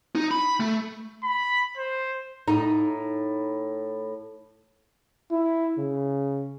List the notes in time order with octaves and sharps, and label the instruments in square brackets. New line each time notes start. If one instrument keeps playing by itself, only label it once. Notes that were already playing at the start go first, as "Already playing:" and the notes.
[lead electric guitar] D#4
B5
A3
[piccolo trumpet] B5
C5
[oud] A2 D#4
[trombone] E4
C#3